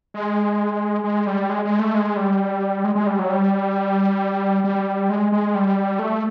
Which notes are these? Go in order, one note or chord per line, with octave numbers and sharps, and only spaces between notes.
G#3
G#3
G3
G#3
G#3
A3
G#3
G3
G#3
G#3
G3
F#3
G3
G3
G#3
G#3
G3
A3